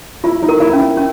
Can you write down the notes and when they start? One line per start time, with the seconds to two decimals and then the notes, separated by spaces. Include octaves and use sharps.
0.24 E4 F4
0.42 D#4
0.49 A#4
0.60 E4
0.73 C#4
0.79 E4
0.97 C#4